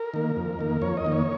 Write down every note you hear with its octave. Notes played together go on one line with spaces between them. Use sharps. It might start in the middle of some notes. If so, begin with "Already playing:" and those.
Already playing: A#4
D#3 A#3
F2
D#3 A#3
F2 C#5
D#5
D#3 A#3
C#5